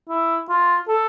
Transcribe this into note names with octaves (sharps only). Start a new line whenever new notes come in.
E4
F4
A4